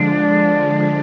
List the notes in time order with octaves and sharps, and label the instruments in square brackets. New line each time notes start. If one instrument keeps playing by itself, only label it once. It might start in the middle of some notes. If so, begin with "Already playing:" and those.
Already playing: [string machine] D3 F3 G#3 [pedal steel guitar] D4